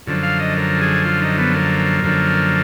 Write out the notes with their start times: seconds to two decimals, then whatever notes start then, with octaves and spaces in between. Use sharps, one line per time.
0.07 F#2 D3 F3
0.23 F5
0.39 D#5
0.56 A#4
0.81 G#4
1.05 F4
1.22 D#4
1.38 B3
1.55 A#3
2.04 F#2 D3 F3